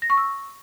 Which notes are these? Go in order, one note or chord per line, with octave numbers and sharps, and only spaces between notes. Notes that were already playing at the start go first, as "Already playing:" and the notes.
A#6
C#6
E6